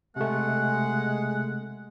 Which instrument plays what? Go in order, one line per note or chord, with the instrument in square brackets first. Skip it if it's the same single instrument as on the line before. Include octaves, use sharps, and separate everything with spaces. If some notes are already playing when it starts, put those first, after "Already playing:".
[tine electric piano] C3 A3 [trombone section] G#3 [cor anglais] F#5